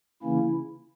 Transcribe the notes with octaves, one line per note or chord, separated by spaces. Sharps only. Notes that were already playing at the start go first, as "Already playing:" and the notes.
C#3 E3 A#3 C#4 E4